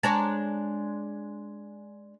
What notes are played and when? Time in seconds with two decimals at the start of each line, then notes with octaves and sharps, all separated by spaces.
0.03 G#3 D4 C#5 A5 A#5